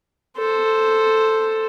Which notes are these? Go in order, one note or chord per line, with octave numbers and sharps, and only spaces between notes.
A4 C5